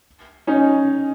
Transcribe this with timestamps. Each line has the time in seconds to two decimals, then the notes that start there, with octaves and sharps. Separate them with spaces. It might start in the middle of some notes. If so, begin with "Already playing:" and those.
0.47 C#4 D#4